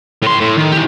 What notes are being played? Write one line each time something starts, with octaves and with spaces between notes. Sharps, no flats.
A2 C6
A2
D#3
E3 G4